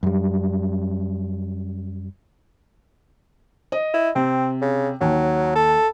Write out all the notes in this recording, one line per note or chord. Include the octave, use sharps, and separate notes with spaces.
F#2 G3
D#5
E4
C3 C4
C#3
D#2 F#3
A4